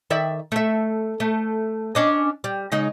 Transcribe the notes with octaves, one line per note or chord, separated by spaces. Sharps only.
D#3 D5 E5
A3 E5
A3
C#4 D4 D#5
G3
C#3 G#3 D#4